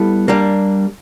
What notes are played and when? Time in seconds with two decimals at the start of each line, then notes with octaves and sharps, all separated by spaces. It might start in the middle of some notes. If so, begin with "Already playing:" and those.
Already playing: G3 B3 E4 A4
0.28 G3 A#3 D4